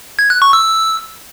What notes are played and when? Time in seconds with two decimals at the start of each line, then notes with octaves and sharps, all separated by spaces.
0.19 G#6
0.30 F#6
0.42 C#6
0.53 E6